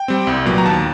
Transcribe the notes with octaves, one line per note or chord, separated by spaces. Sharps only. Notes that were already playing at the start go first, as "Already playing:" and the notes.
Already playing: G5
G3 C4
C2
A#2 F#3 B3
A#5
D#2 A5